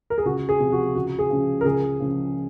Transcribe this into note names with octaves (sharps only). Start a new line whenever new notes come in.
A#4
G#4
C#2 F#4
G#4
C3 F3
F#4
C#2 F#4
G#4
C#3 F3
A#4
C#2 G#4
C#3 F3